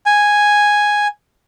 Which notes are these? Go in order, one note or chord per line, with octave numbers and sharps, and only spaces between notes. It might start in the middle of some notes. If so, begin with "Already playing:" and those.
G#5